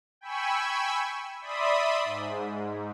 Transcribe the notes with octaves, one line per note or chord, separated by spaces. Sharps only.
G5 G#5 B5 C#6 E6
D5 E5 B5 C6 D#6
G#2